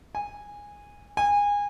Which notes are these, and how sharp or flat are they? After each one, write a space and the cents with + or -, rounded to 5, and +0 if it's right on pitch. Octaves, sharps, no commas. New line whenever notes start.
G#5 -15
G#5 -25